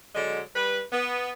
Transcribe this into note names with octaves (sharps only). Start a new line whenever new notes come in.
D3 F#3 G#3
G3 B4
B3